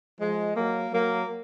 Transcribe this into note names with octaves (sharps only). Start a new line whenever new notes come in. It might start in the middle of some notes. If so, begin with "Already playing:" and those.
F3 G#3
F#3 A#3
F#3 A#3